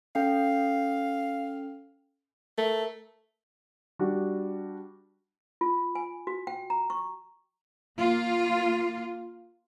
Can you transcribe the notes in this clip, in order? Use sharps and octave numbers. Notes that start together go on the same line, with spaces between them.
C#4 A4 F5 G5
A3 A#4
G3 D4 F#4
F4
G#5
F#4
G5
A#5
C#6
A#3 F4